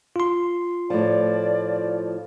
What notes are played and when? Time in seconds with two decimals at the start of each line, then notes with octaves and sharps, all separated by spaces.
0.16 F4 C6
0.90 A2 F3 D5